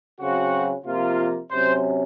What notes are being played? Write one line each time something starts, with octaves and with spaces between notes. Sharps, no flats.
C#3 F#3 C4 F#4
C3 F3 A#3 F4
C3 F#3 C#4 C5